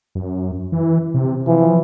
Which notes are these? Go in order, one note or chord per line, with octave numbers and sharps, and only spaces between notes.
F#2
E3
C3
E3 F3